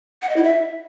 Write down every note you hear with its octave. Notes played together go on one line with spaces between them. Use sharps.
F#5
D#5
E4
E5